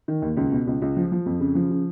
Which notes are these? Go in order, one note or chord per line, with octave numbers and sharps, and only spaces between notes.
D#3
D#2
C#2
B2
C#2
C#2
F3
F3
F2
C#3
F3
C#3